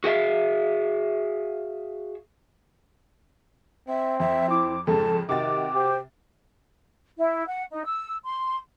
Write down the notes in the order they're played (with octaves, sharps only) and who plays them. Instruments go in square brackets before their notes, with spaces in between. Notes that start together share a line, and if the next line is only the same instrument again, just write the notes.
[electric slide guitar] F#4 G#4 E5 F5
[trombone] C4 [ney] E5
[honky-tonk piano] F2 [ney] E5
[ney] E4 [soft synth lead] D6
[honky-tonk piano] F2 G#2 C#3 [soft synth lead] A4 [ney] A5
[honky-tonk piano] C3 F#4 A6 [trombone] D#3 [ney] G5 [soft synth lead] D6
[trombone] G4 [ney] C5
[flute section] E4
F#5
D#4
E6
C6